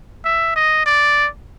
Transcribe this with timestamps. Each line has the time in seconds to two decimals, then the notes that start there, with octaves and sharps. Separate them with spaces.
0.25 E5
0.56 D#5
0.86 D5